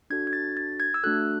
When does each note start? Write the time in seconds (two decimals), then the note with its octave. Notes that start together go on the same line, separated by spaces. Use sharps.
0.10 D4 F#4 A4 G#6
0.27 G#6
0.33 A6
0.57 A6
0.80 G#6
0.94 E6
1.03 A3 D4 F#4 A4 F#6